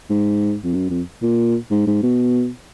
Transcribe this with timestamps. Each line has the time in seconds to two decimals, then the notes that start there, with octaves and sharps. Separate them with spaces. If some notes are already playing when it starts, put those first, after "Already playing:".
0.10 G#2
0.64 F2
0.74 F#2
0.90 F2
1.22 A#2
1.71 G#2
1.87 G#2
2.03 B2